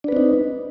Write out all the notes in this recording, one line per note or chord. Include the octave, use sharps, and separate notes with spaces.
C4 D4 D#4 B4